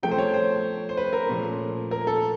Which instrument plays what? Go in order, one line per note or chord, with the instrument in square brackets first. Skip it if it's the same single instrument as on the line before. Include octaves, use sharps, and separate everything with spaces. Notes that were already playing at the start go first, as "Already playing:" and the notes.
[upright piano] C3 F3 A3 G5
C5
C#5
C5
C5
B4
A#4
A#2 F3 A3 C#4
A#4
A4